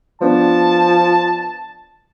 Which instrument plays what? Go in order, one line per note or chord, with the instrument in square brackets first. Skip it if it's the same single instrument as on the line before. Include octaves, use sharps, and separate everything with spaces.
[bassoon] F3 [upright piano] B3 D4 [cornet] A5